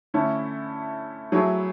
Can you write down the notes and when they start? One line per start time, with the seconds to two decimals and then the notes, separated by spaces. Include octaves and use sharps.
0.14 D3 A3 C#4 E4
1.32 F#3 A3 E4 G#4 C#5